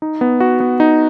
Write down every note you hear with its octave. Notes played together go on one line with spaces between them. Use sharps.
D#4
B3
F#4
B3
D#4